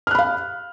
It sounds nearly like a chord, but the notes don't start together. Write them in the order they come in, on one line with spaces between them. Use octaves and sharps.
F6 F#6 B5 F5